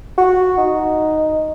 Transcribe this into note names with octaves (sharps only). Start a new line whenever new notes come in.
F#4
D#4